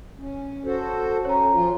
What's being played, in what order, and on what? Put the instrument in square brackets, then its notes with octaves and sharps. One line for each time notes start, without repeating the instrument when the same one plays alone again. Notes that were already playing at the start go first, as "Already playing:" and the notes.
[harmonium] C#4
F#4 A4 C5
[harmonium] C#4 [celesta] C#5 A#5
[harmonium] F3 F4